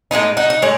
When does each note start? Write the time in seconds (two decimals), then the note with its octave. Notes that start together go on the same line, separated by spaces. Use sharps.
0.11 A2 G#3 B3 D#4
0.37 D#4 F#4
0.50 D#4
0.62 A2 G#3 C#5